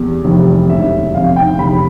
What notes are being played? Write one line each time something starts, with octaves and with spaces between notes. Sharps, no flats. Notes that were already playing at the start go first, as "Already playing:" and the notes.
Already playing: E2 B2 G3
F1 F2 E3 G3
E1 D2 D3 G3 E5
F1 F2 C3 F5
G5
F1 E2 D3 G3 B5